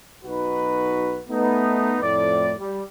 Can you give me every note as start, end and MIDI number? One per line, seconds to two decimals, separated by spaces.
0.24 1.21 35
0.24 1.21 63
0.24 1.21 66
0.24 1.21 71
1.29 1.97 57
1.29 1.97 59
1.29 1.97 63
2.01 2.52 41
2.01 2.52 45
2.01 2.52 74
2.58 2.81 55